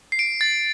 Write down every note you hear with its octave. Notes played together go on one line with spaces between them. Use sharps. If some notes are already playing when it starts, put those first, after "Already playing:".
C7
D7
A6